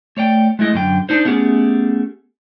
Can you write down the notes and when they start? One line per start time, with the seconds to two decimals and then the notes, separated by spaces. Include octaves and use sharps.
0.17 A3 C#5 D5 G5
0.59 G#3 A3 E4 D#5
0.74 F#2 D3 G5
1.09 D4 D#4 C5
1.25 A3 B3 C#4 G4 G#4